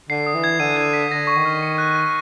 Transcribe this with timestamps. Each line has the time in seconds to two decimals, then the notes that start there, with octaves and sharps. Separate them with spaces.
0.09 D3 C7
0.27 D#6
0.34 E3
0.44 G#6
0.60 D3 D#7
0.77 G#6
0.93 B6
1.11 D3 A#6
1.27 C#6
1.36 D#3
1.45 F6
1.62 C#7
1.78 F#6
1.95 A#6